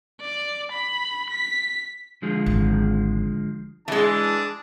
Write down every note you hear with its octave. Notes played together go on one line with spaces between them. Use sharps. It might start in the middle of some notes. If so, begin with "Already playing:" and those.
D5
B5
B6
D3 F3 G#3
G#1
E3 G#3 D4 G#4 A5